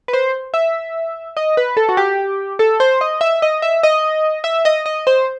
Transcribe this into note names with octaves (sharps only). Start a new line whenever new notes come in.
B4
C5
E5
D#5
B4
A4
F#4
G4
A4
C5
D#5
E5
D#5
E5
D#5
E5
D#5
D#5
C5